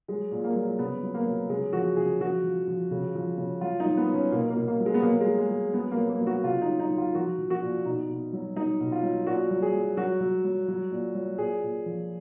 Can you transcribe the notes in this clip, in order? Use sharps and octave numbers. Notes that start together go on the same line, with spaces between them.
F#3 G#3
A#2
A#3
F#3
C#3 B3
F#3
A#3
F#3
C#3 G#3
F3 F#4
C#3 G#4
F3 F#4
F3
F3
C#3
F3
C#3
F#3 F4
D#4
F#3
B3
F#3
C#4
B2 A#3
A#3
B2
A#3
F#3
G#3
B3
F#3 A#3
G#3
F#3
G#3
F#3
F#3 B3
A#3
F#3
A#3
F#3
F#4
C#3 F4
D#4
F#3
D#4
F#3
F4
F3 F#4
F3
F#4
A#2
B2 D#4
B2
F#3
F#3 D#4
B2
F4
F#3
A#2 F#4
F#3
G#4
F#3
F#3 F#4
F#3
F#3
F#3
A#2
F#3
A#2 G#4
A#2
F3